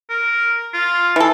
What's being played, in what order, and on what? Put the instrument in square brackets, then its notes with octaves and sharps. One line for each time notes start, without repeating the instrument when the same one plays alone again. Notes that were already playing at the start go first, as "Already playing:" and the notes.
[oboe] A#4
F4
[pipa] E3 A4